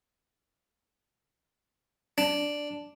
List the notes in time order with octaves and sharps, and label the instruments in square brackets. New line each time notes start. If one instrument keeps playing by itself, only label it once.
[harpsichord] D4